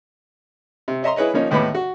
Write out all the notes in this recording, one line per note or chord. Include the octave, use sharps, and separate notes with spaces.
C3
C#5 D#5 E5 A#5 C6
E4 G#4 B4 C#5 D#5
F3 A#3 C#4 D#4
D#2 A2 G#3 B3 B5 D6
F#4